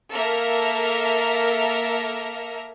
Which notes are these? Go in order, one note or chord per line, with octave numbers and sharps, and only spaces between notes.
A#3 A4 A#4 E5 F6 A#6